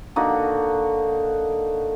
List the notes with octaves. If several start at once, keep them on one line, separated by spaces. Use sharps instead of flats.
D3 A#3 D#4 F#4